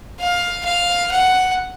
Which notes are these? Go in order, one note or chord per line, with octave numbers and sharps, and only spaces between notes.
F5
F5
F#5